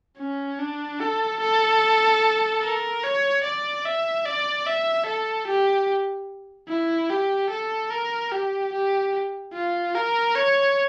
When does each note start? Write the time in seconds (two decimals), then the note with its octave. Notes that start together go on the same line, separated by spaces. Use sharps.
0.19 C#4
0.59 D4
1.01 A4
1.41 A4
2.63 A#4
3.04 C#5
3.44 D5
3.85 E5
4.26 D5
4.67 E5
5.07 A4
5.48 G4
6.69 E4
7.10 G4
7.51 A4
7.91 A#4
8.32 G4
8.73 G4
9.53 F4
9.95 A#4
10.36 C#5